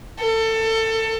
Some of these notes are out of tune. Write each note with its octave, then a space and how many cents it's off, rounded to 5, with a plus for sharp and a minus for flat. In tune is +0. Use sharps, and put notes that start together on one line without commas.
A4 +25